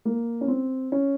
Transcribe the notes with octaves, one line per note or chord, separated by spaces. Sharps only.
A#3
C#4
C4
C#4